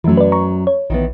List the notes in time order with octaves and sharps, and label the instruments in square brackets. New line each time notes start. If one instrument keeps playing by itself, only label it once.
[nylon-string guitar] F#2 F#3 [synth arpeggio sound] E3 A3
[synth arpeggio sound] B4 D5
A#5 C#6
C#5
[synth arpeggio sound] A#1 [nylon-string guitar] D#3 E3 B3